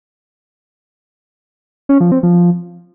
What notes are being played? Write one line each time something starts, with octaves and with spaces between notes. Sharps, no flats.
C#4
F3
C4
F3